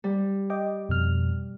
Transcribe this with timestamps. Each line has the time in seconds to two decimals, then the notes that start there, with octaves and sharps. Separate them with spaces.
0.04 G3
0.50 D#5 G5 D6
0.89 F2 B2 F6